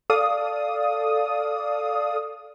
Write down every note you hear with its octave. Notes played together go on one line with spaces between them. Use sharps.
A4 D5 F5 D#6